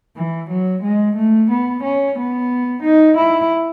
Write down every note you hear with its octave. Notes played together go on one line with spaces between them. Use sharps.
E3
F#3
G#3
A3
B3
C#4
B3
D#4
E4